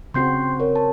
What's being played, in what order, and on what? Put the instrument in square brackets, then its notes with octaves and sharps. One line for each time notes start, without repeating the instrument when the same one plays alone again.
[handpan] C#3 C4 F#4 [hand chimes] C6 G6 C7
[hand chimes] A#4 C#5
A5